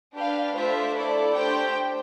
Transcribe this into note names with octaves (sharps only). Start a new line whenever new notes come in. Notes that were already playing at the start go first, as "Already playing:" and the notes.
D4 G4 B4 F5
A3 D4 F4 C5 E5
A3 E4 A4 D5
A3 D4 G4 C5 G5